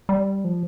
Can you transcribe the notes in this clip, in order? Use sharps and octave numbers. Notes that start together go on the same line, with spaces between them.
G3
F3